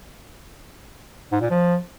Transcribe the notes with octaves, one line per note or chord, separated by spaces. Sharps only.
G#2
A#2
F3